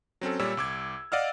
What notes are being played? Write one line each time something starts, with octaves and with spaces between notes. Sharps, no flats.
F#3 C4 C#4 A4
A#2 G3 C#5 E6
C2 D6 G#6
D5 D#5 F5 F#5 E6 F6